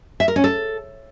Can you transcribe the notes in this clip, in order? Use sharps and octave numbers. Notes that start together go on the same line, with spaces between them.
E5
A#4
C#4
A4